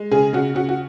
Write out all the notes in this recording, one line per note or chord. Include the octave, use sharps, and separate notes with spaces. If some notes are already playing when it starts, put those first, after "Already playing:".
Already playing: G#3
C#3 G#4
C#3 F#4
C#3 F#4
F#4